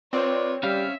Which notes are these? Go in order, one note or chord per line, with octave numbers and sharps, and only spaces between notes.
C4 F4 B4 C#5 D5
G3 C#4 E5 F5